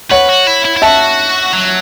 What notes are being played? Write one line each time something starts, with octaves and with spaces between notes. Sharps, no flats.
B4 C#5 F#5
F#4
E4
E4
E4
F#4 E5 A5
F#3